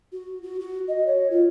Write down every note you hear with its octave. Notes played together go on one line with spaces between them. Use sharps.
F#4
F#4
F#4
D#5
C#5
F4